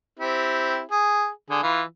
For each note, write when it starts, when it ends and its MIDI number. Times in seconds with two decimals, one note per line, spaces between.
0.19 0.80 60
0.19 0.80 64
0.19 0.80 67
0.91 1.29 68
1.50 1.61 50
1.50 1.61 68
1.62 1.82 52
1.62 1.82 65